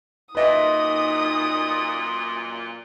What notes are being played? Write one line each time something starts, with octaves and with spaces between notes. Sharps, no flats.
F#2 A#2 D#4 B4 D#5 E5 D#6